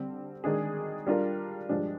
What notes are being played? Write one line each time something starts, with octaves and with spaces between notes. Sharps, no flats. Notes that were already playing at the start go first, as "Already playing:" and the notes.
Already playing: D3 G3 C4
D#3 G#3 D4 G#4
G3 D4 F4 A#4
G2 F3 G#3 D4 G4